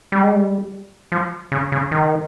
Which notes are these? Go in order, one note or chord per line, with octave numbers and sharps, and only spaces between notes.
G3
G#3
G3
F3
C#3
C#3
D#3